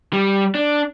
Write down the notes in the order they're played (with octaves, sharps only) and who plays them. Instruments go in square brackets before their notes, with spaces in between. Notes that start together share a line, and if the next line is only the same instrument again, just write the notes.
[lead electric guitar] G3
D4